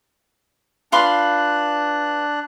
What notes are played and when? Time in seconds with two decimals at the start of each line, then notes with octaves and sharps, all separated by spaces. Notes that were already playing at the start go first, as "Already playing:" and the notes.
0.92 D4 F4 B4 C6 F#6